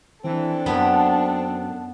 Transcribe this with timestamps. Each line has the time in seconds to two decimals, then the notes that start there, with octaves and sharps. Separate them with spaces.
0.24 E3 C4 D4 A4
0.66 F#2 B3